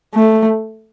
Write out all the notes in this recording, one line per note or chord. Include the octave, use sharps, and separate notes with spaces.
A3